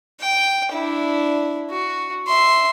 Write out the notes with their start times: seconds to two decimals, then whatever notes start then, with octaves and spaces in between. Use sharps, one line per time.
0.20 G5
0.72 D4 E4
1.71 F#4
2.27 E5 C6